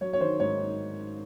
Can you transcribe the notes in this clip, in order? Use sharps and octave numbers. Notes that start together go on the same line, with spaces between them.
F#3 C#5
C#5
D#3 C5
G#2 C#5